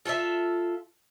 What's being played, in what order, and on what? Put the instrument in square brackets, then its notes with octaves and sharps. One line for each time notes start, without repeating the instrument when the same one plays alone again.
[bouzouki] F4 A4 C#5 E5